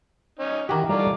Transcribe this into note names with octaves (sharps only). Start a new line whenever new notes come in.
C#4 D#4
D#3 E3 F#4 G4 A#4
G3 F4 A4 D5 A#5 D6